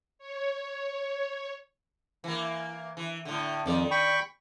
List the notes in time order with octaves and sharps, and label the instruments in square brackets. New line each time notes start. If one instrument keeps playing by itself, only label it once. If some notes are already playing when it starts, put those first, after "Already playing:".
[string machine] C#5
[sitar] E3 A#3
E3
A2 D3
[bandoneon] F2 [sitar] D#3 D5
[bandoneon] G5 B5 C#6